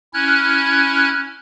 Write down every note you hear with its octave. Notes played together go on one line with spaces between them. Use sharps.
C#4 E4 F6 F#6 G#6